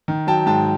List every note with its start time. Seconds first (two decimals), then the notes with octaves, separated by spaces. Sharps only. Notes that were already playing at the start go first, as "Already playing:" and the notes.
0.08 D#3
0.27 F#3 G5 A5
0.46 G#2 G5 A5